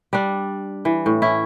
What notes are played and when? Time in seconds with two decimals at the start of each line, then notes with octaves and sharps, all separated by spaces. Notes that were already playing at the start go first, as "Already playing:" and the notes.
0.13 G3 D4
0.85 E3
1.06 A2
1.22 C#4 E4